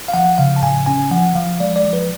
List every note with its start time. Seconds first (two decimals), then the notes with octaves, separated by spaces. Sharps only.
0.08 F5
0.14 F3 F#5
0.38 C#3 F5
0.56 A5
0.62 A2 G#5
0.86 C#4 G#5
1.11 F3 F#5
1.35 F3 F5
1.60 G#3 D5
1.76 D5
1.84 F3
1.93 B4